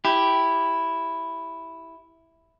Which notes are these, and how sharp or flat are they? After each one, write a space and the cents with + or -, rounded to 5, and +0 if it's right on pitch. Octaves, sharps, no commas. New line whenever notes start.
E4 +0 G4 +0